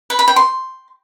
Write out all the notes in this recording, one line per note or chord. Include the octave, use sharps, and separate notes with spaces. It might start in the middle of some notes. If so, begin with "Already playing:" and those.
B4
B5
G5
C6